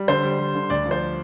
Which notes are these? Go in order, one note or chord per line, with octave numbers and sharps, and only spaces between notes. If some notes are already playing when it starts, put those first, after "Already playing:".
Already playing: G3
D3 C5
G3
G3
D3
D2 D5
F3
C5